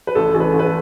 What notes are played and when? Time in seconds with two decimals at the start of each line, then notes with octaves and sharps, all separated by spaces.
0.07 B4
0.15 A1 A4
0.34 A1 A4
0.40 B4
0.54 A1
0.59 B4
0.66 A4